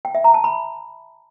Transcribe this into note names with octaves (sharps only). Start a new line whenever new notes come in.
G5
E5
A#5
A5
B5